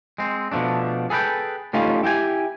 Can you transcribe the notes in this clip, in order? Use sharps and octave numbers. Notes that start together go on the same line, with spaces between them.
G#3 C4
B2 F3 A3 D4
G#4 A4 B4 D5 G5
G3 A3 C#4 D#4 F4
E4 G4 G5 G#5